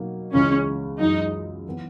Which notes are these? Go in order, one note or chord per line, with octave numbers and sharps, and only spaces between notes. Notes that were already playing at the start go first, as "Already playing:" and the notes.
Already playing: B2 F#3 A#3 D#4
C#2 C#3 E3 G#3 C#4
F#2 E3 G#3 D#4
E3 B3